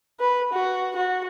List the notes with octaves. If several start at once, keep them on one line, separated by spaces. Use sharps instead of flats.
B4
F#4
F#4